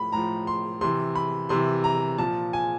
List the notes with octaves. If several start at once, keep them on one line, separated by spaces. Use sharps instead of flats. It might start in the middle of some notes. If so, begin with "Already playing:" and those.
Already playing: A2 F3 B5
A2 F3 A#5
C6
C3 E3 C6
B5
C3 E3 C6
A#5
A#2 F3 A5
G#5